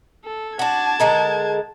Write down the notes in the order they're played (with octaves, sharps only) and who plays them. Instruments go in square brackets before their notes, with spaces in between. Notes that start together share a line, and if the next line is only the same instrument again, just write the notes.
[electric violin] A4
[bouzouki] D4 F#4 [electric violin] A5 G#6
[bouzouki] D3 G#3 A#4